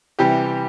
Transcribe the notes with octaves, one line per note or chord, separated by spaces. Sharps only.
C3 E3 G3 G4